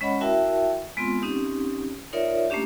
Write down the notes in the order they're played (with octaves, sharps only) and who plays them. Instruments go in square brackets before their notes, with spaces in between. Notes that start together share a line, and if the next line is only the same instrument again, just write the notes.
[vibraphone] G#3 C#4 C#5 D#5 F#5 B5
E4 F#4 A#4 E5 G5 A5
G#3 B3 C4 F4 C6
C4 C#4 D#4 G4
D#4 F4 A#4 C#5 D5 E5
A3 A#3 C#4 D4 G4